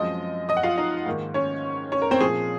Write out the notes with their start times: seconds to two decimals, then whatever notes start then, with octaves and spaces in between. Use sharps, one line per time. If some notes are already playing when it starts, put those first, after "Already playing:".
Already playing: F#2 F3 G#3 C4 D#5 D#6
0.49 D#5 D#6
0.57 F#5
0.63 F4 F5
0.78 D#4 D#5
1.06 G#2 D#3 A#3
1.34 C#4 C#5
1.92 C#4 C#5
2.02 A#4
2.11 C4 C5
2.20 A#2 F3 A#3 G#4